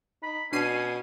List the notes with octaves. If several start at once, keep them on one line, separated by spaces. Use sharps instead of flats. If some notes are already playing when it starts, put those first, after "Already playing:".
D#4 B5
B2 C#4 D4 C7 D#7